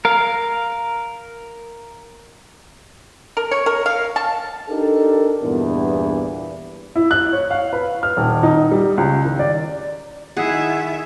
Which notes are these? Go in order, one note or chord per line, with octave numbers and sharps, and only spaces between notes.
A#4 F5
A#4
C#5
A#4
F5
A5
D4 D#4 G4 A4 A#4
E2 G2 A#2 B3 D4 E4
E4
F#6
C#5
F5
B4
F6
D#1
D#4
G3
C#2
D#3
D5
D#3 E4 G#4 E5 F#5